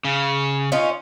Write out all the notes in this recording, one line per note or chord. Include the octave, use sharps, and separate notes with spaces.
C#3
C#4 D#4 F4